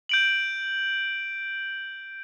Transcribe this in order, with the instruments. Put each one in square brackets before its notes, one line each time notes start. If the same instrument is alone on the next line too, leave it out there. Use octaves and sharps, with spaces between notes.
[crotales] G6 D7 F#7